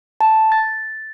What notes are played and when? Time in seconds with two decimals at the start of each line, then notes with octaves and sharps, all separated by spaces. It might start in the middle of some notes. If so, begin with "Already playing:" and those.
0.21 A5
0.52 A6